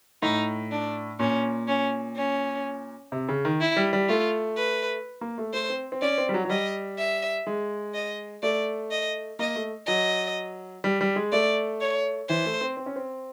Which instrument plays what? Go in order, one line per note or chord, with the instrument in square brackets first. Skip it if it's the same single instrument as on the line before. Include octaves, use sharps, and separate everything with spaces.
[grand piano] A2 [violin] D#4
[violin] D4
[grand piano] A#2 [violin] C#4
[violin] C#4
C#4
[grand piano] C3
C#3
D#3
[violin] E4
[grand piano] G3
G3
[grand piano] A3 [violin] F4
[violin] B4
[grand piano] A#3
A3
[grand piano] A3 [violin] C5
[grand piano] C4
C4
[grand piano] C#4 [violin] D5
[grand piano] C4
G3
F#3
F#3
[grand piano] G3 [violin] D#5
[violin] E5
[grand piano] G#3
[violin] D#5
[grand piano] A3 [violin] D5
[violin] D#5
[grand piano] A#3 [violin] D#5
[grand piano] A3
[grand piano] F#3 [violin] D#5
[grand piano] G3
G3
G#3
[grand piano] A3 [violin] D5
[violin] C#5
[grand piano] E3 [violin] C5
[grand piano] A3
C4
C4
C#4
C4